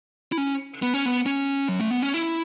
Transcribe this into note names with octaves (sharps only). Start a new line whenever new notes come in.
E4
C#4
B3
C#4
B3
C#4
F#3
A3
B3
C#4
E4